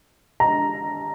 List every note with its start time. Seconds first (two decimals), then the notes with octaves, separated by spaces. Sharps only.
0.40 A#5